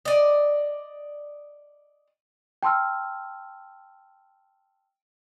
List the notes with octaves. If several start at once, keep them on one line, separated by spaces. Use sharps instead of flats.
D5 D#5
G5 A5 C6 E6 F6